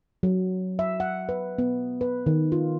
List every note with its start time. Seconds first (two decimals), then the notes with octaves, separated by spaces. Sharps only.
0.23 F#3
0.79 E5
1.00 F#5
1.29 B4
1.58 B3
2.01 B4
2.26 D#3
2.52 F4